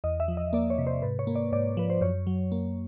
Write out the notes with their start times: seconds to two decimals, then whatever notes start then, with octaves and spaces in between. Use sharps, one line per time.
0.04 E2 D#5
0.20 E5
0.28 F3
0.37 D#5
0.53 A#3 D5
0.70 C#5
0.78 C3
0.87 C5
1.02 G#2 B4
1.19 C#5
1.27 A#3
1.35 D5
1.52 G#2 D5
1.77 F3 B4
1.90 C5
2.01 F#2 C#5
2.27 F#3
2.52 A#3